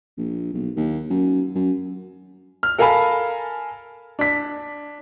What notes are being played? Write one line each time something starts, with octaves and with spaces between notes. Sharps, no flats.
A#1
B1
D#2
F#2
F#2
F6
A4 A#4 F5 G#5 A5 B5
D4 B6